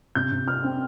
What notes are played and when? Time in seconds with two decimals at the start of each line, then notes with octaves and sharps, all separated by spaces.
0.15 C3 G6
0.31 C3
0.48 C4 F6
0.64 C4